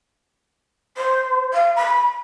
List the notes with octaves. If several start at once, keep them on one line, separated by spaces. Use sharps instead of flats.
C5
F5
B5